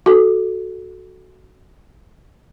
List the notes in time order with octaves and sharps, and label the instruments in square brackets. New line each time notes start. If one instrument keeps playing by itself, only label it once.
[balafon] F#4 A4